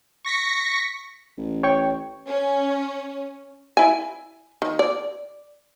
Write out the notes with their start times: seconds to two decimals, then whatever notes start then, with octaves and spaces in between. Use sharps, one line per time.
0.25 C#6 A#6 B6 C#7
1.37 A1
1.63 C#5 G5 C#6
2.28 C#4
3.77 E4 G#5
4.62 D#3
4.79 D5